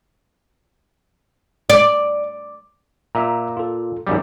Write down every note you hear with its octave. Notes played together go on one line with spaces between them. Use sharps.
D5
A#2 E5 A#5
F4 A4
G#1 F#2 G3